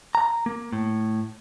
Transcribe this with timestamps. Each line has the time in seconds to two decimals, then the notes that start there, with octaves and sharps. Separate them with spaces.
0.15 A#5
0.46 A#3
0.73 A2